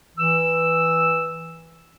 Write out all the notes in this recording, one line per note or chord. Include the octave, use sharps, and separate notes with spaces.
E3 E6